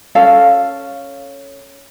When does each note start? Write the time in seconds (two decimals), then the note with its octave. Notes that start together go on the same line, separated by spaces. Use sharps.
0.15 C#4 A4 F5